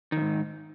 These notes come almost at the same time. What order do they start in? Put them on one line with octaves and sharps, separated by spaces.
D#3 F2 G#2